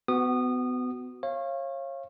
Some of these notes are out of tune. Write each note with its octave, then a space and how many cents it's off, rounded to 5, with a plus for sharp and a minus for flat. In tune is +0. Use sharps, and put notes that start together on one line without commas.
B3 +30 F#4 +0 D#6 -25
C#5 -30 F5 -20